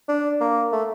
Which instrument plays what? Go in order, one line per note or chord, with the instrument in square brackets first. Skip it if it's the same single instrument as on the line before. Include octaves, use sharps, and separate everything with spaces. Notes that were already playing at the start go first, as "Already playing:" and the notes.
[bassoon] D4
A#3
A3